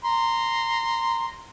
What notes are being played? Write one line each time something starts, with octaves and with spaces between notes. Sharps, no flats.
A#5 C6